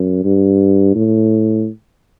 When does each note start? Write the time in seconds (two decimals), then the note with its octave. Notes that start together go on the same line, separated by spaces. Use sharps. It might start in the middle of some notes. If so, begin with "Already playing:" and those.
Already playing: F#2
0.25 G2
0.95 A2